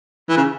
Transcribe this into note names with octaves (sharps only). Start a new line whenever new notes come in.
E3
C#3